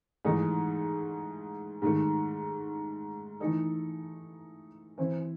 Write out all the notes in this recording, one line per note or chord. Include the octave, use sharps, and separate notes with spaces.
G#2 E3 A3 D#4
G#2 D#3 A3
E3 A3 D#4 A4
E3 C4 E4